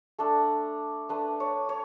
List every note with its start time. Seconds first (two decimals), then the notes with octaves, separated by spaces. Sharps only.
0.19 A3 D4 A4
1.09 A3 D4 B4
1.40 C#5
1.69 C#5